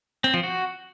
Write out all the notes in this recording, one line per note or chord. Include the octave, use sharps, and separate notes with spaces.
C4
F3
F#4